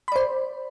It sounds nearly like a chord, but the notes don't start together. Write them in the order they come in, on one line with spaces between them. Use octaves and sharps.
B5 D5 C5